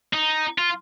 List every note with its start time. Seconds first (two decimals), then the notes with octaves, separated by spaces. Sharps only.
0.13 D#4
0.58 F4